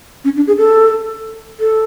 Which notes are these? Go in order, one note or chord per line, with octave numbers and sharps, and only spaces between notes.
C#4
D4
G#4
A4
A4